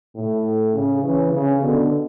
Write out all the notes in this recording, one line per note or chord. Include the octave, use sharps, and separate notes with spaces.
A2
C#3
C#3 E3
C#3
B2 D3